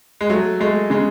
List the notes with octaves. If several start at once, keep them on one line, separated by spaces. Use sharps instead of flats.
G#3
F#3 A3
G#3 A3
C#3 G#3